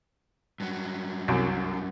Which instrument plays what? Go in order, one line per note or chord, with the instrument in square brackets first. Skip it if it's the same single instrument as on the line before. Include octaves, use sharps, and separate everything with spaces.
[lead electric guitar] G2 F#3
[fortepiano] C2 F#2